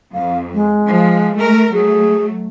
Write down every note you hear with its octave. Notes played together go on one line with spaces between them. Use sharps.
F2 F5
G#3
F3
A3 A#4
F#3 A3 G#4